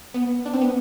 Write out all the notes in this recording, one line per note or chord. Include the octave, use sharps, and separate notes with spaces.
B3
D4
C4
B3